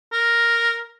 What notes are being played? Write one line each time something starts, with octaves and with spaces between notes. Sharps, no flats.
A#4